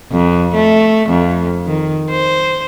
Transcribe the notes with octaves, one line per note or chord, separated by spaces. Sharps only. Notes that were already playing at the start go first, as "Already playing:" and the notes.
F2
A3
F2
D#3
C5